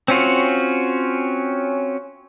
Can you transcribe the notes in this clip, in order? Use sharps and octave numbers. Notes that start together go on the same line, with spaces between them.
C4 C#4 F4 F#4